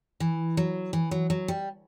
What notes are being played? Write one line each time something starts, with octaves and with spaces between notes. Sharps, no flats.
E3
F#3
E3
F#3
F#3
G3